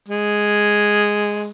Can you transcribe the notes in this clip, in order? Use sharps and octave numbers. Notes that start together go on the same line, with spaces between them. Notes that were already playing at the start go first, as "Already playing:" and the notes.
G#3